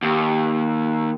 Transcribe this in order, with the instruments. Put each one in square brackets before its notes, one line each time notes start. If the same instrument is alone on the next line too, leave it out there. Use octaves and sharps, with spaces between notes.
[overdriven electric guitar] D#2